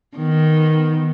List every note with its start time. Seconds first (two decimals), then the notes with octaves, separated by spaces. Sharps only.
0.17 D#3 B3